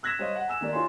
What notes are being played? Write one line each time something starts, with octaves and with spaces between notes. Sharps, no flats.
E6 F#6 G#6 A#6 B6 E7
G3 C5 C#5 D#5 F5
F#5
G#5 E6 E7
D#3 A#3 G4 D5
D#4 F4 G4 C#5 G#5 C6